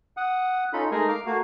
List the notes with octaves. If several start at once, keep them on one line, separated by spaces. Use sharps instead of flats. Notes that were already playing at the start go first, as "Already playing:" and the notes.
F#5 D#6
C#4 D#4 F4 A4 B5
G#3 A3 D#4 G#4 A#4 G#5
F5 D6 F6
A3 A#3 F#4 F5